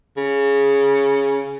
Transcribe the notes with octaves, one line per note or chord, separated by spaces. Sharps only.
C#3